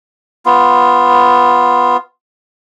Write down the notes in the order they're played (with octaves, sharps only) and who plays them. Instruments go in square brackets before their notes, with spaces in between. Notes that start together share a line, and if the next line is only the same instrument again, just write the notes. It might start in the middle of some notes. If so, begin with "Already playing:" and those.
[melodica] B3 F4